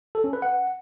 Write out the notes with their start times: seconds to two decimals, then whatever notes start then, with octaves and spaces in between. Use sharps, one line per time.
0.15 A4
0.24 C#4
0.33 B4
0.42 F#5